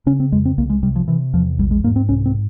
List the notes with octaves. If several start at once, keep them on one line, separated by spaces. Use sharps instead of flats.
C#3 C#4
C4
F2 G#3
C4
C2 A#3
G#3
C3 G3
F3
C3 E3
E2 F3
A#1 G3
G#3
G#2 A#3
C4
C2 C#4
C4